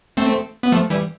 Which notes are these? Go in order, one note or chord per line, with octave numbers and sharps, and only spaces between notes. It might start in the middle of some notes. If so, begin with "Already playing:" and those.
A3 C4
B3
F3 A3
E3 G3